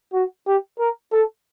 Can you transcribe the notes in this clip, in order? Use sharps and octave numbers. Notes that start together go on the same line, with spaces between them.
F#4
G4
A#4
A4